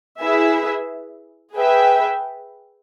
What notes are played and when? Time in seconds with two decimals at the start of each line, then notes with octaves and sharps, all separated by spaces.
0.20 E4 G#4 B4 E5
1.55 G#4 B4 E5 G5